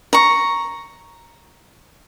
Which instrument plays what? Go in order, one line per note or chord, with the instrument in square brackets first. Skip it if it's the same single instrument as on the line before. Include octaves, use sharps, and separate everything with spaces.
[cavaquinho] A#5 C#6